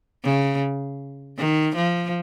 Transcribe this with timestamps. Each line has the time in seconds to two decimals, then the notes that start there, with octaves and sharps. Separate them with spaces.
0.24 C#3
1.37 D#3
1.76 F3